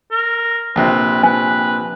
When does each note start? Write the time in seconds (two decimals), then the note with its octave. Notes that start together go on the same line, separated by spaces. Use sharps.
0.11 A#4
0.76 A#1 C3 B4
1.23 B4 G#5